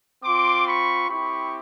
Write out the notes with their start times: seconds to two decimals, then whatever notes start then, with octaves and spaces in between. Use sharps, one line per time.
0.24 C4 F4 C6 D6
0.67 B5 C#6
1.10 C4 E4 G4 B5 C#6